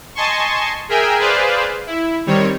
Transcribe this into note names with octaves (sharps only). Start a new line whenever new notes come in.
D#5 G#5 A5 C6 C#6
G#4 A#4 E5 G5 G#5
G#4 B4 C5 D5 F5
E4
D#3 G3 C4 C#5